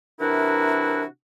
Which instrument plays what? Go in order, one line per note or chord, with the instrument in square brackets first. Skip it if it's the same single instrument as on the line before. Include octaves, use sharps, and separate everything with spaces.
[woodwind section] C3 E3 D4 E4 F#4 A#4